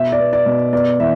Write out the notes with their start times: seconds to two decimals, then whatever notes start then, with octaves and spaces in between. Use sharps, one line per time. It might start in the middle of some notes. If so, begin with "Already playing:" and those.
Already playing: B2 E5
0.12 D5
0.19 B3
0.33 D5
0.46 B2
0.73 B3 D5
0.99 E3 E5